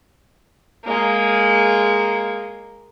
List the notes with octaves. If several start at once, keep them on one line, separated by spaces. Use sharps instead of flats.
G#3 A#3